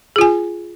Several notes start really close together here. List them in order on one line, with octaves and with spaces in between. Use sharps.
G#4 F4 G#5